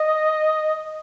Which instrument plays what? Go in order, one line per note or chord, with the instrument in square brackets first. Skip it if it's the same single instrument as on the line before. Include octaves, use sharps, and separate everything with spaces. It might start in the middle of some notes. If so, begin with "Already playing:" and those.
Already playing: [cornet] D#5